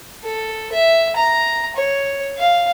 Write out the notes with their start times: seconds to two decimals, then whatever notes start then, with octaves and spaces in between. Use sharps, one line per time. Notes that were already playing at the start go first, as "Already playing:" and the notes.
0.24 A4
0.72 E5
1.16 A#5
1.76 C#5
2.39 F5